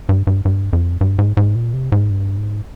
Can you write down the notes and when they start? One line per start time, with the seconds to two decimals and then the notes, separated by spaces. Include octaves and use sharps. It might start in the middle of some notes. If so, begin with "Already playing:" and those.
0.09 G2
0.27 G2
0.45 G2
0.73 F2
1.01 G2
1.19 G#2
1.37 G#2
1.55 A#2
1.73 C3
1.92 G#2
2.10 G2
2.38 G#2